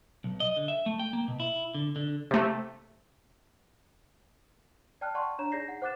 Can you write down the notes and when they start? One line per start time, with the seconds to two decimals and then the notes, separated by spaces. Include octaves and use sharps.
0.24 B1
0.40 D#5
0.57 D3
0.68 E5
0.86 A3
0.99 G5
1.13 A#3
1.28 B2
1.40 E4
1.75 D3
1.96 D3
2.31 C3 A3
5.01 D5 G5 A5 F6 F#6
5.15 D5 F#5 A5 C6 C#6
5.39 D4 C#5 A#5 E7
5.52 D#4 G#4 D5 G6 A#6 C7
5.68 F#5
5.82 C5 F#5 D6 F#6 A6 E7